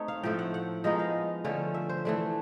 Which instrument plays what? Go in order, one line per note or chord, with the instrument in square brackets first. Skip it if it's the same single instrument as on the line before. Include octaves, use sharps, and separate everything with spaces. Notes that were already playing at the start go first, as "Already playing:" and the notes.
Already playing: [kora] A3 C4 D#4 C#5
F5
A2 F3 A3 C4 G5
F#5
F#5
F3 G#3 B3 D#4 D#5
F5
D3 F3 A3 C#4
E5
C5
E3 A3 D4